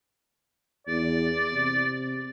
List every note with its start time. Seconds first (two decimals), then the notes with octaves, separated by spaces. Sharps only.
0.87 E2 D5
1.53 C3